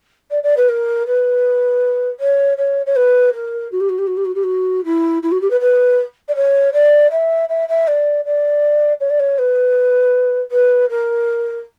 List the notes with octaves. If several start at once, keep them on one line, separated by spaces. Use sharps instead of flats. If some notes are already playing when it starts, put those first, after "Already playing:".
D5
D5
B4
A#4
B4
C#5
C#5
C#5
B4
A#4
F#4
G4
F#4
G4
F#4
G4
F#4
G4
F#4
E4
E4
F#4
G4
B4
B4
D5
C#5
D5
E5
E5
E5
D5
D5
C#5
D5
C#5
B4
B4
A#4